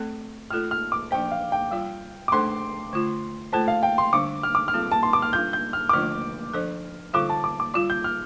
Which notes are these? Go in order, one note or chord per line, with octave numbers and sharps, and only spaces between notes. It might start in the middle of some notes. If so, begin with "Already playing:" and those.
Already playing: A3 C4 A4 D5
A3 F4 A4 D5 F6
F6
D6
F3 D4 G4 C5 G5
F5
G5
G3 F4 D5
D6
A3 D4 A4 C5 C6
D3 A3 F4
A3 F4 A4 C5 A5
F5
G5
C6
D3 G3 D4 D6
F6
D6
F6
G3 C4 F4 A4
A5
C6
D6
F6
G3 D4 F4 A4 G6
G6
F6
D6
D3 F3 A3 D4 F4 F6
F3 D4 A4 C5
D3 G3 F4 A4 D6
A5
D6
D6
G3 F4 D5 D6
G6
F6